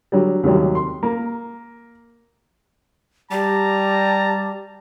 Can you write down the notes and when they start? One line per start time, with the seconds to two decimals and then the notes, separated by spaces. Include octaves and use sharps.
0.12 D3 F#3 G3
0.43 D#2 C3 F#3 G3
0.75 C6
1.03 A#3
3.31 G3 G4 A5 A#5